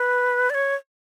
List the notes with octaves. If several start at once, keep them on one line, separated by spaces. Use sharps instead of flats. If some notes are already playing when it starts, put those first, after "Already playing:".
Already playing: B4
D5
C#5